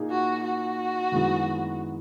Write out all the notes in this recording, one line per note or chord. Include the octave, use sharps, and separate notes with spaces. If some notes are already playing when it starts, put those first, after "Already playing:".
Already playing: A#2 A#3 D#4 G#4
F#4
F#4
F#2 D#3 G#3 B3 E4